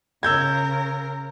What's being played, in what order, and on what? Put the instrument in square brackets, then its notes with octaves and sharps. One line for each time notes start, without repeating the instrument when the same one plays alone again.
[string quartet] C#3 A#4 [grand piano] E6 G6 G#6